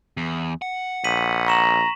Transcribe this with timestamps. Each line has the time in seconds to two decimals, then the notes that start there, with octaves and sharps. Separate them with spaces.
0.17 E2
0.62 F#5
1.04 A#1 B6 D#7 F#7
1.47 A#5 C#6 E7 F#7